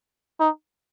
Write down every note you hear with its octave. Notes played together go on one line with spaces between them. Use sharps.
D#4